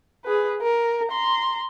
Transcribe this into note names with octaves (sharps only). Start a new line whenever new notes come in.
G#4 B4
A#4
A#5 C6